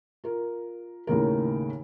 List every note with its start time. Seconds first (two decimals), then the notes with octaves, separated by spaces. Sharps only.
0.24 F4 A#4
1.07 D#2 A2 C#3 A#4